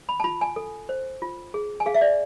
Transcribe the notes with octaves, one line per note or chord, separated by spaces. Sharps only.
B5
A5
F4 B5
G#5
A4
C5
F4
G#4
G#5
G#4 F5
E5
D5